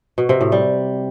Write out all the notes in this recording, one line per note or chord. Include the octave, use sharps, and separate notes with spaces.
B2
C3
A2
G3